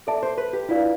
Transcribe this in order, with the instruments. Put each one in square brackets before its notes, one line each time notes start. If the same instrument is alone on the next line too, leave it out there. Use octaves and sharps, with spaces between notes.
[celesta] A4 E5 A5 [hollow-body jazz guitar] D5
[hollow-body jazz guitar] C5
B4
G4
[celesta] D4 F4 B4 D5 F5 [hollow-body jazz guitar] E4